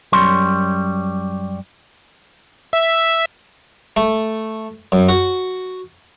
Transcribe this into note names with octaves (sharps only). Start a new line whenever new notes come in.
F#2 G3 C#5 C6
E5
A3
F#2
F#4